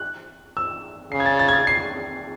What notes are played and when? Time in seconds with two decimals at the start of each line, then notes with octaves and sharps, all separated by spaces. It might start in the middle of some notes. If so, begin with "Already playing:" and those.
Already playing: F#6
0.57 E6
1.12 C#3 C7
1.20 G#6
1.26 A6
1.39 A6
1.48 G#6
1.53 A6
1.67 C7